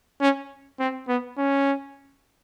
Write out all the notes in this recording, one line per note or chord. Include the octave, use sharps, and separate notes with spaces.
C#4
C4
B3
C#4